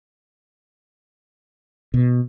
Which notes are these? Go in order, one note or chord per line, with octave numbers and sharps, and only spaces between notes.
B2